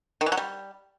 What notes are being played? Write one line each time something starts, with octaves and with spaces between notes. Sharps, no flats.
D#3
E3
F#3
G3